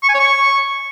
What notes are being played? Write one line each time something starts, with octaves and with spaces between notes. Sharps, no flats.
C#6
G#5
C#5
C#6